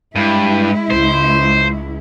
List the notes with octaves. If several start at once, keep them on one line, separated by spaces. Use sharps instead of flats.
G2 G#3 E4
C#2 C5